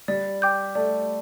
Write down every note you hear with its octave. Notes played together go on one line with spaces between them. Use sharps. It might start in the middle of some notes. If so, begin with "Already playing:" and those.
G3 D5
G5 D6 G6
A3 D5